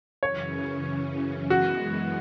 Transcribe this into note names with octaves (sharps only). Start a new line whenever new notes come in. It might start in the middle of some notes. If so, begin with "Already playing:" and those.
F#2 C#3 E3 C#4 C#5
F#2 E3 G#3 B3 F#4